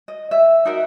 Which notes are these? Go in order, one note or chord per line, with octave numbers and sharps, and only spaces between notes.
D#5
E5
D#4 F#4 A#4 E5